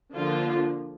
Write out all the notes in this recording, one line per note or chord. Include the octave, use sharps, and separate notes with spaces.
D3 F3 A#3 F4